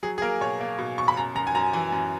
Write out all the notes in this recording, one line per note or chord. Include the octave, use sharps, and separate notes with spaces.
F#3 G#4
G#4
A#3 A#4
B2 C#5
A#3
B2
B2 C#6
B5
F#2 A#5
F#2 A#5
G#5
F#2 A#5
E3 G#5
F#2